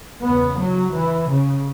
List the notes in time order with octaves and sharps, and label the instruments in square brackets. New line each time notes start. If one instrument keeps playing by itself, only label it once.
[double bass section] E2 C#3 B3
F#3
E3
C#3